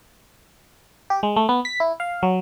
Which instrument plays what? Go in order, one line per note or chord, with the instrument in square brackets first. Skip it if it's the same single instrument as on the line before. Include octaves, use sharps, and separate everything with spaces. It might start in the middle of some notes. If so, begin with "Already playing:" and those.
[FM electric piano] G4
G#3
A3
B3
B6
E4
F5
F#3